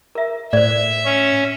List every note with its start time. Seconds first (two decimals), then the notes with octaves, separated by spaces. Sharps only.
0.15 A#4 E5
0.53 A2 C5 D5 E5
1.05 C#4